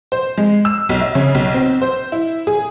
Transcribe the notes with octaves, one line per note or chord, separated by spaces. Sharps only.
C5
G#3
E6
B1
E5
C#3
B1
C4
C5
E4
G#4